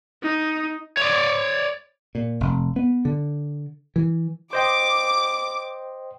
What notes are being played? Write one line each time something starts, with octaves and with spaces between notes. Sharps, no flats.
D#4
C#5 D5
A#2
F1
B3
D3
E3
C5 D#5 G5 D6